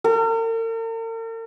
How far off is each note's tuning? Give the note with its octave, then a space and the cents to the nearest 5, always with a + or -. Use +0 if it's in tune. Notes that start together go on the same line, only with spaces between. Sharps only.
A#4 -45